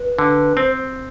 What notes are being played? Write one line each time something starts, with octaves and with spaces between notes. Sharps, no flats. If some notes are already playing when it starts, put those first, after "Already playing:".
Already playing: B4
D3
C4 C5